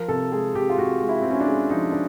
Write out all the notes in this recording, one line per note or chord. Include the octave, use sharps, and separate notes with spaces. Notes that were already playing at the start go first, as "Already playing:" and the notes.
Already playing: F3 A#4
C3 A4
G#3 G#4
C3 G4
F4
C3 F#4
G#3
E4
G#3 C4
C#4
D4
G#3
F3 D#4
D4